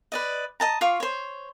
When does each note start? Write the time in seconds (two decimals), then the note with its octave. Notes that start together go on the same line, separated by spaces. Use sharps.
0.12 B4 D5 D#5
0.60 D#5 A5 A#5
0.81 F4 F5 C#6 D6
1.00 C5 C#5